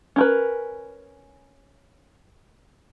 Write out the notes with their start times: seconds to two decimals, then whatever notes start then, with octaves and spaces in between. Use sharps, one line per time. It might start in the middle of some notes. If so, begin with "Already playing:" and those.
0.16 C#4 A#4 B4